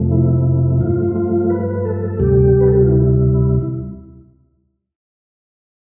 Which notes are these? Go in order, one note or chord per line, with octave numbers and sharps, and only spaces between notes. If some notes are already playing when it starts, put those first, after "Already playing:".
Already playing: F2 C3 F3 A3
E4
G2 F3 A3 F4
F4
B4
A4
D2 C3 G3 G4
B4
A4
G4
F4
E4